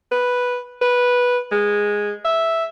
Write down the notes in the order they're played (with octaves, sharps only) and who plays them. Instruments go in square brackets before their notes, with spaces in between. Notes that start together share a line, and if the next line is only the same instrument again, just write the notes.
[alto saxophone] B4
B4
G#3
E5